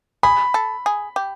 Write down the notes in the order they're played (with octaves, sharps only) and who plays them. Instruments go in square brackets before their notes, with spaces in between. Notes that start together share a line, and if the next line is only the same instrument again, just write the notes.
[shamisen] G#4 [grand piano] B5
[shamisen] A4
G#4
G4